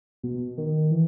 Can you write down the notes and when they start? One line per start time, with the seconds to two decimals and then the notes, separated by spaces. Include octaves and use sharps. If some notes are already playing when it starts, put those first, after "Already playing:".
0.23 B2
0.58 D#3
0.91 E3